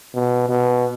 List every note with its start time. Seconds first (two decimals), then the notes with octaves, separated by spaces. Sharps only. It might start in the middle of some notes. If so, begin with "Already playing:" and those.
0.14 B2
0.49 B2